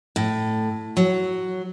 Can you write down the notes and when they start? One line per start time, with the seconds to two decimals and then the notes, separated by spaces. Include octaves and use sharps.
0.16 A2
0.97 F#3